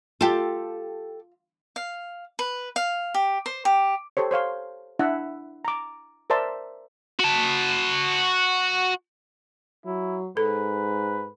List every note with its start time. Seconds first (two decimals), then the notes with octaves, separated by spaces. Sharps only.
0.21 F4 G4 A4
1.76 F5
2.39 B4
2.76 F5
3.14 G4
3.46 C5
3.65 G4
4.17 G4 A4 C5 C#5
4.31 C5 C#5 F5 C6
4.99 D4 E4 E5 F#5
5.65 A#5 D6
6.30 A#4 C5 D5 E5 A5 C6
7.19 F#4 A5
9.86 F#3 E4
10.37 G#2 A4 B4